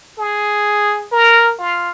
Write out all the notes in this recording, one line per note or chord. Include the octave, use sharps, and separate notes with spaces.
G#4
A#4
F4